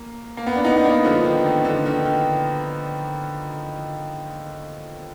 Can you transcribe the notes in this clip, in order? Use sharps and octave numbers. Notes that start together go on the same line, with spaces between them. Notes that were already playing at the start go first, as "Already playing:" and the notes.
Already playing: A#3
A#3
B3
D4
B3 D#4
B3
A#3 D4
D3 F3
D#3
D#3
D#3
D3
D#3
D#3